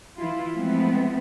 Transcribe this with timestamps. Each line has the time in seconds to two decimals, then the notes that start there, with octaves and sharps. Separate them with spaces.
0.19 E3 E4 F4
0.55 F3 G#3 A3 B3 C4 E4